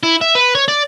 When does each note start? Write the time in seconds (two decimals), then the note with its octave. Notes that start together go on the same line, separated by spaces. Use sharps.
0.03 E4
0.21 E5
0.35 B4
0.55 C#5
0.68 D5